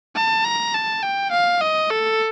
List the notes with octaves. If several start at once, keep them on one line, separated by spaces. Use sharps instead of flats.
A5
A#5
A5
G5
F5
D#5
A4